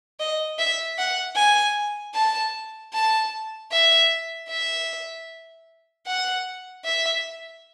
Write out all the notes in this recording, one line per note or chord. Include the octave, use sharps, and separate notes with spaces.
D#5
E5
F#5
G#5
A5
A5
E5
E5
F#5
E5